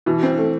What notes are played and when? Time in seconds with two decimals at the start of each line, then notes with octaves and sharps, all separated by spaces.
0.06 B2 E3
0.23 C4
0.38 A3